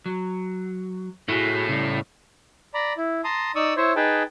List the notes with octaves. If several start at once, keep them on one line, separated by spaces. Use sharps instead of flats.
F#3
A2 E4 F#4 G#4
C#3 G3
D5 A#5 B5
E4
A5 A#5 C6 D#6
D#4 D5 C#6 D#6 E6
E4 C5 C#5 E5
D#4 G#4 B4 G5 A5